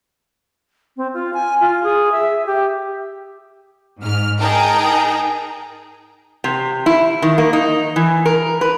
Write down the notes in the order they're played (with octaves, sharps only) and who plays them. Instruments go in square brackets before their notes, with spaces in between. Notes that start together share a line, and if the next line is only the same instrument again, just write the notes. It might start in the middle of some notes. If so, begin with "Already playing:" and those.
[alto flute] C4
F4
G#5
F4
G#4
E5
G4
[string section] G#2 F6
D#4 G#4 A#4 G5 A5 A#5
[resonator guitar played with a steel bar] C3
E4
D#3
A#3
D#4
E3
A#4
B4